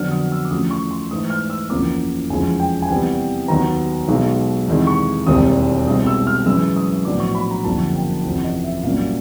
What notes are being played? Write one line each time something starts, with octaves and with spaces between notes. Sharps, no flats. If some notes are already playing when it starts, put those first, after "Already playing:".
Already playing: F2 D3 F#3 B3 D4 F6
D#6
E6
D6
E2 C#3 F3 A3 D#6
C#6
C6
G#2 E3 A3 D#6
F6
E6
F#1 E2 C#3 F3 A#3 D6
F1 E2 C#3 F3 G#3 G#5
G5
G#5
E2 C3 E3 G3 B3 G5
D#2 D#3 F#3 B3 A#5
B1 B2 G#3
E2 C3 D#3 G#3
C#6
E1 D#2 D#3 G3 C4 D#6
C2 B2 G#3 C4 D#6
E6
F6
F#2 C#3 E3 G#3 E6
D#6
A#1 A2 F#3 B3 D4 D6
C#6
B5
A#5
F#1 F2 D3 F#3 A#3 A5
G5
F#1 E2 C3 F3
D#5
E5
C2 A#2 F#3 A#3 C#4 F5